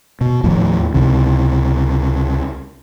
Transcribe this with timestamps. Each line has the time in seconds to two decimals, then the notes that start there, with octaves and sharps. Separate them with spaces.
0.21 B2
0.44 D#2 A2 F3
0.94 C#2 C3